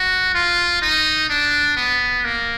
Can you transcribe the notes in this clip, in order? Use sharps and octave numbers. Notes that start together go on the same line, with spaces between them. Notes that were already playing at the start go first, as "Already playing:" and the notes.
Already playing: F#4
F4
D#4
D4
B3
A#3